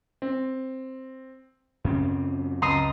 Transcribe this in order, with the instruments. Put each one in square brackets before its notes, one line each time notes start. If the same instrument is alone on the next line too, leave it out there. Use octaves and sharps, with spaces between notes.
[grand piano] C4
[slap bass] F#2 C4 [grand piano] C#3
[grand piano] C#2 [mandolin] A#5 C6 D#6